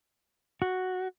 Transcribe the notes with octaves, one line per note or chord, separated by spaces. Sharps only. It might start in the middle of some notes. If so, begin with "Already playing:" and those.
F#4